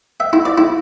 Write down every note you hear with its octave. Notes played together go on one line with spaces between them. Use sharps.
E5
E4
D5
E4